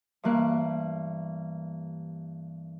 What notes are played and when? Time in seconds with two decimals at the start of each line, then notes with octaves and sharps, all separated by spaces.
0.23 G2 E3 A#3 F#6